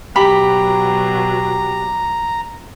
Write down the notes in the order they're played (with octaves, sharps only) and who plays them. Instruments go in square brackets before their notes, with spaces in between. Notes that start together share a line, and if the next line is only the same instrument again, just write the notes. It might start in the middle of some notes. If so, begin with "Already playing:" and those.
[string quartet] B2 F#3 [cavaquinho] G4 [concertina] A#5 [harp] B5